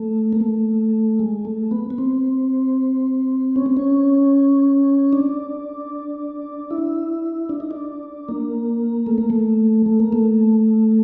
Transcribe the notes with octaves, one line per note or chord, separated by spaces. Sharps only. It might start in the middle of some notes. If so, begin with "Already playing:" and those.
Already playing: A3
A#3
A3
G#3
A3
B3
B3
C4
C#4
C4
C#4
D4
E4
D4
D#4
D4
A#3
A3
A#3
A3
A3
A#3
A3